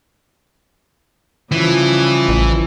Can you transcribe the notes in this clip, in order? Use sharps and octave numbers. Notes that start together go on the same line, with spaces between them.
C#3 E3 F3 G3
A1